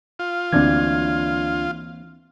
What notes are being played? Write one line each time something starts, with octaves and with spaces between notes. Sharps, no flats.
F4
D2 E3 A#3 C4 D4 G#6